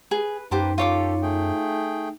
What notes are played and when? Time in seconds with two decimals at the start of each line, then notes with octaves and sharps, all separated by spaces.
0.11 G#4 B4
0.51 F#2 A#3 D#4 G4 B4 C5 A5
0.78 F4 G4 A4 C#5 D6
1.22 A3 G#4 G5